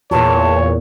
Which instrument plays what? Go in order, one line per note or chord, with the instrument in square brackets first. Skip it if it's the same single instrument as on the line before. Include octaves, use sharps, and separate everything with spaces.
[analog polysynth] E2 A#2 [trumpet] C#5 [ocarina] A5